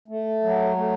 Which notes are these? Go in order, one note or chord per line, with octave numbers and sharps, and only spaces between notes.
A3
F#3
A3